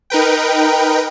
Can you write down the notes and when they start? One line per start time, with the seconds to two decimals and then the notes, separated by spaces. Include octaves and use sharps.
0.10 D#4 A#4 B4 G5